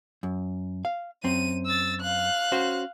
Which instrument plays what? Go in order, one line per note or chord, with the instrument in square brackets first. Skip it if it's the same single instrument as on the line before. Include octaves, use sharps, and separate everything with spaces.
[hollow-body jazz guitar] F#2
F5
[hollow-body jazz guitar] F#2 C4 [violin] D#7
[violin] E6 A6
F5 F#6
[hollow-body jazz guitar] C#4 F#4 C5